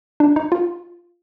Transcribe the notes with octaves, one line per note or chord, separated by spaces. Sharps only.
D4
D#4
F4